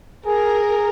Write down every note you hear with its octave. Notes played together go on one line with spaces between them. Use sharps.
G#4 A#4